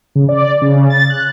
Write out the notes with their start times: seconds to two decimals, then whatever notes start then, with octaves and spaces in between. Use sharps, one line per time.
0.15 C#3
0.29 D5
0.62 C#3
0.90 A6
1.10 F#6